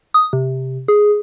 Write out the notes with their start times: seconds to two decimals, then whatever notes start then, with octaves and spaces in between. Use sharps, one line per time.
0.14 D#6
0.33 C3
0.88 G#4